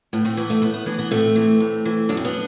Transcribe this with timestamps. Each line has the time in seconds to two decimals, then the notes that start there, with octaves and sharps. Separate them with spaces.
0.13 A2 B3
0.25 A3 C4
0.37 E3 B3
0.50 A3
0.62 A2 B3
0.74 B3
0.86 E3 B3 D4
0.99 B3
1.11 A2 A3 C4
1.36 E3
1.60 A2
1.85 E3
2.09 F#2 D4
2.17 C4
2.25 B3 D4